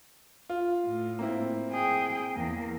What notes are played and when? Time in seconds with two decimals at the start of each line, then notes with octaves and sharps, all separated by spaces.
0.49 F4
0.87 A2
1.19 A#3 C4 E4
1.72 G#4 G5
2.35 E2 A#3